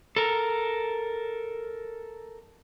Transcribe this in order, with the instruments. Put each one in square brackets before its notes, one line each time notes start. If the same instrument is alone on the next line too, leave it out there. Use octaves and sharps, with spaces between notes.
[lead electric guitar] A4 A#4